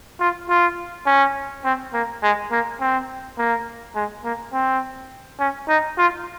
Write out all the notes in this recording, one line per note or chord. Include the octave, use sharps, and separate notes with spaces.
F4
F4
C#4
C4
A#3
G#3
A#3
C4
A#3
G#3
A#3
C4
C#4
D#4
F4